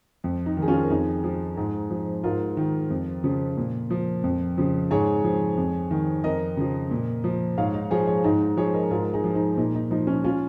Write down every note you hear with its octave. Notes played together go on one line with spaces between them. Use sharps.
F2
D#4
D#3
G#4
C#4 F4
A#4
F2 D#4 G#4
F3
G#2
F3
G#2 F4 A#4
D#3
F2
C#3 F3
A#2
F3
F2
C#3 F3
G#2 G#4 C#5
F3
F2
D#3
F2 A#4 D#5
C#3 F3
A#2
F3
G#2 C#5 F5
D#4
F3 G#4 C#5
G#4 C#5
G#2 D#4
D#4
F3 G#4 C#5
A#4 D#5
G#2 F4 A#4
D#4 G#4
F3
D#4
A#2 D#4
D#4
F3 D#4
C#4
C#4 F4